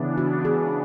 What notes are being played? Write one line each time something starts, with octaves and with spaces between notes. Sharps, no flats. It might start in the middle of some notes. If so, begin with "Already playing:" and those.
Already playing: C#3 E3 B3 D4
F#4
G#4